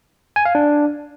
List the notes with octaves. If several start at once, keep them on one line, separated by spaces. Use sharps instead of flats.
G#5
F5
D4